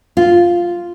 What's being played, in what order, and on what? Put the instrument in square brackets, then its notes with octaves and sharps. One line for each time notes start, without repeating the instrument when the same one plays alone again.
[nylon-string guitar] F4